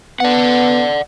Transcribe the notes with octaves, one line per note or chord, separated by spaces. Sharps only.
B3 D5 F#5